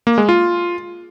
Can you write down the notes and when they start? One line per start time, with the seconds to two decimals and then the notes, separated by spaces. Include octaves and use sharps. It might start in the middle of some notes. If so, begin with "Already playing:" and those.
0.07 A#3
0.18 G#3
0.29 F4